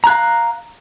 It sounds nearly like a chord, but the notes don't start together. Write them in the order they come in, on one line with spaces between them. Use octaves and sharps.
A#5 F#6 F5